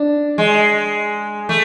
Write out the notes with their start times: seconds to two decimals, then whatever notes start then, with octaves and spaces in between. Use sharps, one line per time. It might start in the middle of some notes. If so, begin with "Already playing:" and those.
Already playing: D4
0.38 G#3
1.49 A3